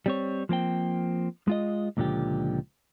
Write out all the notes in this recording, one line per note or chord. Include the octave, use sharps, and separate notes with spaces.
G3 C4 C#5
F3 A#3 C4 G5
G#3 F4 D#5
C#2 A#2 D3 F3 G4